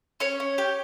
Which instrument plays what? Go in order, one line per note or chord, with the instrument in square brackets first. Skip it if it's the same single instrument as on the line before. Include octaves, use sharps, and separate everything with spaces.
[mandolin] C#4 C#5
C#4
G4